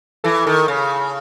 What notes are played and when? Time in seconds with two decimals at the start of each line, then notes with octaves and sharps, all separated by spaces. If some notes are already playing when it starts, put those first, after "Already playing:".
0.24 E3 A4
0.46 D#3 A4
0.68 C#3